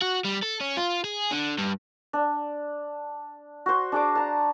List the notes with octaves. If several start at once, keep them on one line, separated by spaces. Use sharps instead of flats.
F#4
G3
A4
C#4
F4
G#4
D3
G2
D4
F#4 C5
D4 G#4 D6
A5 A#5